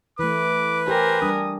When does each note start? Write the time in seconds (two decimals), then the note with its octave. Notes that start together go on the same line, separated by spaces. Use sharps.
0.19 E3 A3 B4 D6
0.88 G4 A#4 C5 G#5
1.22 G3 D4 D#6